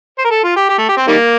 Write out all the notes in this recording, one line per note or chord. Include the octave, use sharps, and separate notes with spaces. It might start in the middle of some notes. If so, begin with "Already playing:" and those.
C5
A#4
A4
F4
G4
G4
A3
G4
C4
D#3 G3 A#3